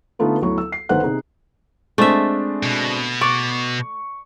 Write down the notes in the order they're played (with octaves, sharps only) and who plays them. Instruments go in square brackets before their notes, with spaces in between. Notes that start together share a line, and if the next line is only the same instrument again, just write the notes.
[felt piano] D3 A3 B3 D#4 F4 B4
D2 F#3 B3 E4 C#6
E6
C7
G1 D#3 B4 C5 F#5 F#6
C3 D#4 G#4
[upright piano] G#3 C4 D4 [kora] A3 E5
[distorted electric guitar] B2
[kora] D5 [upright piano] C#6